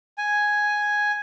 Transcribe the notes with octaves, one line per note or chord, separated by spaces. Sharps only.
G#5